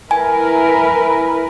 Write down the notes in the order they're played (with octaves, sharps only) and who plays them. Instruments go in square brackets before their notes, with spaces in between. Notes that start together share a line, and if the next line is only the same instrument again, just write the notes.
[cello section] E4 A#4 B4 [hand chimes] G#5